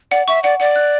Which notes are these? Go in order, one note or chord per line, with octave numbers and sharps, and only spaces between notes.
D5 F#5
E5 C#6
D5 F#5
D5 F#5
F#6